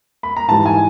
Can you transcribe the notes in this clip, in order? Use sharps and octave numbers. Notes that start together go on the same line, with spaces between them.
B5
A#5
G#2 E3 G3 A5
G#5